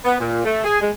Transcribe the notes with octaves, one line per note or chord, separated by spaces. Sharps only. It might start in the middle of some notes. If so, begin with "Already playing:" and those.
B3
A#2
A3
G#4
G#3